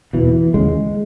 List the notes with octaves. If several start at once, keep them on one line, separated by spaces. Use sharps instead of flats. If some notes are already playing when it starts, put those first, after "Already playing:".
E2 B2 E3
D#2 C#3 G#3